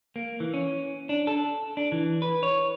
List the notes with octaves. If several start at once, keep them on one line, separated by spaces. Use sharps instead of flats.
A#3
E3
C#4
D4
A4
D4
E3
B4
C#5